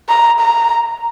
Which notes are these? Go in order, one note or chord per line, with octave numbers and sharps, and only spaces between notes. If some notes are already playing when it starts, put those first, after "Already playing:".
A#5
A#5